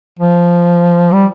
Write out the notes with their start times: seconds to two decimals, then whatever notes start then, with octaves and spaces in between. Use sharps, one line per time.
0.19 F3
1.12 G3